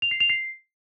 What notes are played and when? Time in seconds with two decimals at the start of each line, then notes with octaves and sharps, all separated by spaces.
0.02 F7
0.11 C7
0.20 F7
0.30 C7